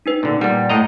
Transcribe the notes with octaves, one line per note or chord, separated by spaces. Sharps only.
D4 D#4 B4
A#2 D3
A#2 G3 F#5
A2 D#5 A#5